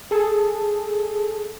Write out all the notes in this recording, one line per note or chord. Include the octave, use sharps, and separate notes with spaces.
G#4 A4